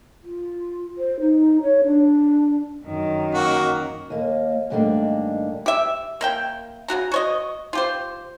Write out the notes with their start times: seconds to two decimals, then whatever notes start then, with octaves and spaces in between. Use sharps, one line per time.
0.24 F4
0.98 C5
1.20 D#4
1.62 C#5
1.85 D4
2.85 F#2 D#3
3.34 A#3 F#4
4.10 D#2 A#3
4.70 G#2 D#3 G3 A3 A#3 D4
5.66 G4 E5
6.21 A#3 E5 G5
6.88 C#3 D#4 F#4 A#5
7.12 F#4 C#5 D#5
7.73 F4 G4 C5